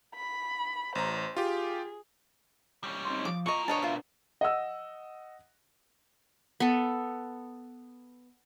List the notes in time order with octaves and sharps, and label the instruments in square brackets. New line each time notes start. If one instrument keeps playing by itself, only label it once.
[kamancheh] B5
[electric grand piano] A1 A#5 [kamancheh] C5
[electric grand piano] F4 G4 [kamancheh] G#4
[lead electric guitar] G3 C#4
[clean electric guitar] C4 D#4 C6
[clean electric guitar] F3 [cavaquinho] D6
[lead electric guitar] B2 A#4 [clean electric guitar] F4 [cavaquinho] D#5 C#6
[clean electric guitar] B3 D4 [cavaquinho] C#5 D#5 A5
[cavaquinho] F4 E5
[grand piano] D#5 F#5 E6
[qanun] B3 A4